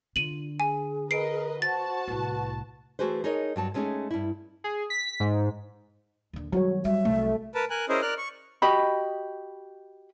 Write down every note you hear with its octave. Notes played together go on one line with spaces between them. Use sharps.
D3 D4 F4 D#7 F#7
G#4 G#5
A#4 B4 D#5 C7 D7
F#4 C5 A5 A6
C2 A2 B4
E3 A3 F#4 G#4 B4 C5
D#4 G#4 A#4 C#5 D#5
G2 F#3 A5
G#3 A3 C#4 D#4 G#4
G2 E4
G#4
B6
G#2
D#2 D3
D#3 F#3 G3 F#4 C#5
G3 E5
C2 A3
A#4 B4 A5
A#4 G#5 F#6
C#4 E4 G#4 A#4 C5 D#5
A#4 D5 F6 F#6
C#6
F#4 G4 D#5 B5